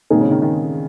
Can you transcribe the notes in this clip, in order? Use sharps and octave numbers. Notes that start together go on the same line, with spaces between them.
A#2 D#3 G#3 C4 D#4 G#4
C#3
D#3
D#3